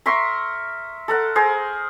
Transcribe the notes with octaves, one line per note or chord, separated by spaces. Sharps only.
A#4 E5 C6 C#6
A4 A#4 F#5
G#4 A#4 C5